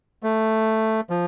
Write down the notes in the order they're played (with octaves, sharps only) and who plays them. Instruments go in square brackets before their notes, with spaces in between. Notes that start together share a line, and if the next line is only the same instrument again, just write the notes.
[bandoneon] A3
F3